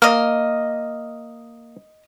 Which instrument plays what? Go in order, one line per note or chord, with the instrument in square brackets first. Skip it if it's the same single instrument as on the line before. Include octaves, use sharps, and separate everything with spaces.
[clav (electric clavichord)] A#3 [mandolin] D#5 F6